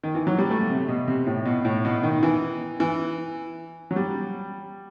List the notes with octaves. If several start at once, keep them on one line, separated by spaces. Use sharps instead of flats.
D#3
E3
F#3
G3
A3
C3
B2
C3
A2
B2
A2
B2
D#3
E3
E3
F#3
G3